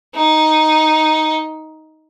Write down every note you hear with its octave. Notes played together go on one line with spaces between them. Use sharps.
D#4